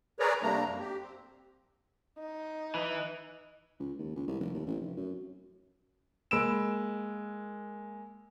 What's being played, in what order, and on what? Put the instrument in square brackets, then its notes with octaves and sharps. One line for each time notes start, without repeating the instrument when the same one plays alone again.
[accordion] G#4 A#4 B4 C#5 D5 A#5
C3 G3 A3 A#3 D4 A#5
F#2 A#3
G4
C4
[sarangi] D#4
[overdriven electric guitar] E3
[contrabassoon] C#2
D#2
C#2
C2
F1
D#2
A1
F1
F#2
[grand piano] G#3 A#3 B5 E6 D7 E7